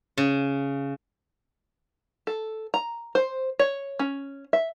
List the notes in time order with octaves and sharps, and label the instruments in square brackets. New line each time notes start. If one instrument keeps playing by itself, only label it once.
[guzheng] C#3
[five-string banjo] A4
A#5
C5
C#5
C#4
E5